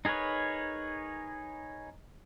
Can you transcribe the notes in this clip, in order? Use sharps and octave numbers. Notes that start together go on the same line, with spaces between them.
D#4 G#4 A#4 B4 C#5